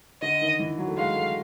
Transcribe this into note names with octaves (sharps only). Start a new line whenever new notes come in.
D3 D#5
D#3
E3
F#3
A3
G#3 F5
A3